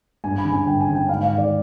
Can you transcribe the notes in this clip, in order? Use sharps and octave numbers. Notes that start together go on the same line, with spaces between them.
G2 G#5
B5
D3
G#5
G2 G5
G#5
D3
G5
G#2 F5
F5
D#3
D5